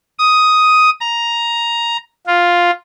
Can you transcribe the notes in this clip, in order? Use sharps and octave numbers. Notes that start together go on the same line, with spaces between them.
D#6
A#5
F4